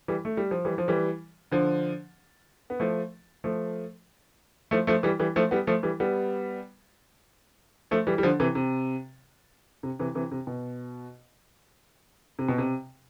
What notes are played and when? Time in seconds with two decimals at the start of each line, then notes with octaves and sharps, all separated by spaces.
0.08 E3 G3
0.25 A3
0.37 G3
0.51 F3
0.65 E3 G3
0.78 F3
0.88 E3 G3
1.52 D3 F3
2.70 B3
2.80 F3 A3
3.44 F3 A3
4.71 F3 A3
4.87 F3 A3
5.03 E3 G3
5.20 E3 G3
5.36 F3 A3
5.51 G3 B3
5.67 F3 A3
5.83 E3 G3
6.00 G3 B3
7.91 F3 A3
8.07 E3 G3
8.18 G3
8.23 D3 F3
8.40 C3 E3
8.55 C3
9.83 C3
9.99 C3 E3
10.15 C3 E3
10.31 C3
10.47 B2
12.39 C3
12.49 B2
12.58 C3